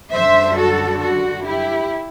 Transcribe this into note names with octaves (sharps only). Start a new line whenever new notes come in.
F#2 D3 G3 D4 C5 E5
F#4 A4
F#4
E4 G4